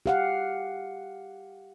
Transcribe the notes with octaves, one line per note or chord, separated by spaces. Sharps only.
G4 F5 F#5